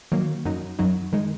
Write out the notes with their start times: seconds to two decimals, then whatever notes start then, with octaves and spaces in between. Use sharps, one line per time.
0.12 D#3 F#3 A#3
0.45 F#2 F#3 D#4
0.79 F#2 F#3 D#4
1.12 D#3 G#3 D#4